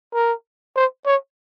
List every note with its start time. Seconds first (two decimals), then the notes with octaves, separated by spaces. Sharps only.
0.14 A#4
0.76 C5
1.06 C#5